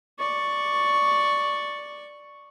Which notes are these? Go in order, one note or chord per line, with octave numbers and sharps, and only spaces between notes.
D5 C#6